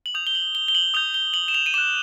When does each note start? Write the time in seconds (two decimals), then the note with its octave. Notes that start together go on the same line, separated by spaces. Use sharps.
0.06 F#7
0.14 D#6 G6 F7
0.27 G7
0.35 F#7
0.55 G7
0.68 G7
0.75 F#7
0.94 D#6 G6 F7
1.14 G7
1.34 F#7
1.48 E7
1.54 F7
1.66 D#7
1.74 D6 F#6 E7